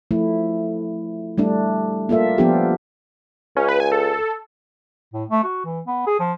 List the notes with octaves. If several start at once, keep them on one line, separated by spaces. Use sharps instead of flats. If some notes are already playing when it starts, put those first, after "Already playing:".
F3 A3 E4
G3 A3 D4
A#3 F4 A4 E5
F3 B3 D4 F4 G4
C#2 C#4
B4
G#5
A4
A2
A3
F#4
E3
B3
G#4
F3